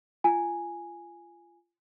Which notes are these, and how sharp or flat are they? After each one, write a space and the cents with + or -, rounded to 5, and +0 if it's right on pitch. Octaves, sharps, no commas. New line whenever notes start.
F4 -25 G#5 +0